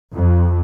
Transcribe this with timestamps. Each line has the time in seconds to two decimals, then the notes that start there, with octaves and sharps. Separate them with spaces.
0.15 F2